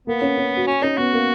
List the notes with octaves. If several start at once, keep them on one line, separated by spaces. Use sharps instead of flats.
A#3 B3
C#4
C#4
F#4
C#4
C#4 D#4
B3 F#4
A#3